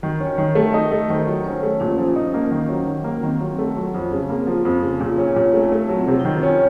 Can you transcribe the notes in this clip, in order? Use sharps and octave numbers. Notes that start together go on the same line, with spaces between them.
D#3 F#4
C#4
D#3
A3
A4
D#4 A#4
A3
D#3 C5
F#3
C#4 C5
A3
A#2 C#4
F3
D#4
A#3
D#3
F#3
D#3
A#3
D#3 C4
F#3
A3
F#3
F2
C#3
A#3 C4
F3
C#4
F2
A#3
C#3
A#2 C4
C#4
A#2 F4
A3
D#4
A3 F4
F#3
C4
C3
D#4
D#3
C#4 F4